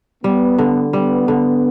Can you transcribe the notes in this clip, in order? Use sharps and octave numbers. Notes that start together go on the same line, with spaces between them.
G3 B3
D3
G3 B3
D3